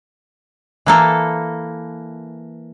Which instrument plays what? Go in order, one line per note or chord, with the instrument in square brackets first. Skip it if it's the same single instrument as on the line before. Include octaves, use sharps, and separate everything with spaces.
[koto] E3 A#3 A4